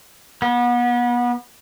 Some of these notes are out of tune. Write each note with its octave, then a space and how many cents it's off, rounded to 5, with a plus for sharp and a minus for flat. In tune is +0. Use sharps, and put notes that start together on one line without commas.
B3 -30